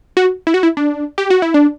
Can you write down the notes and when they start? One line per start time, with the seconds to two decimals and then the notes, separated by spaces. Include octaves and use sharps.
0.17 F#4
0.47 E4
0.54 F#4
0.63 E4
0.77 D4
1.18 G4
1.30 F#4
1.42 E4
1.54 D4